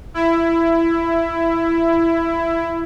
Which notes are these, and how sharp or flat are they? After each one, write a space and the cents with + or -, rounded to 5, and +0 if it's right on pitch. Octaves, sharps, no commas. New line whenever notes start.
E4 +15